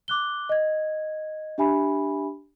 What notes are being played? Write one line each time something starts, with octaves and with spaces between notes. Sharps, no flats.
D6 F#6 G7
D#5 G#6
D4 G4 E5 G#5 B5